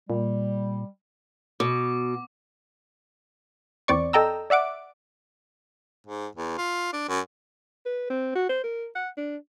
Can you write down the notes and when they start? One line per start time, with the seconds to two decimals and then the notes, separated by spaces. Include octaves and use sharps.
0.10 A#2 G3
1.60 B2 D6
3.88 E2 C4 D5 C#6
4.13 A4 D#5 G5 A#5 E6
4.50 D5 E5 F#5 D6
6.07 G#2
6.35 E2
6.58 F4
6.93 D4
7.09 F#2
7.86 B4
8.10 C4
8.36 F#4
8.50 C5
8.64 A#4
8.96 F#5
9.18 D4